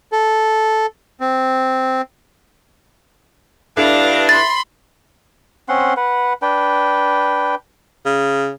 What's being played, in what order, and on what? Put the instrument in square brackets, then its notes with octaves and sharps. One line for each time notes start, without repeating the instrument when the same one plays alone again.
[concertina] A4
C4
[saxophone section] G2 D4 [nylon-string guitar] E4 A4 B4 [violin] F5 A#6
[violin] B5 C6 [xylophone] A6
[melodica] C4 C#4 F#5 C6
B4 F#5
D4 B4 G5
[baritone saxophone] C#3